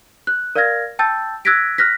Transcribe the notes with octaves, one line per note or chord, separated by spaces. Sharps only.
F#6
A#4 D5 F5 F6 G#6 A#6
G5 A5 E6 G6 A6
E6 F#6 G#6 A#6 B6 D7
F6 F#6 A#6 B6